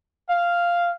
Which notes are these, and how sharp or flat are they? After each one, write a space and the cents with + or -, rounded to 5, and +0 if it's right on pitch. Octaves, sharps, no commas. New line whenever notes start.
F5 -5